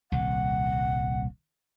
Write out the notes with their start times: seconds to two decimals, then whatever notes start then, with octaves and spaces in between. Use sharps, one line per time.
0.12 D#1 C2 F#5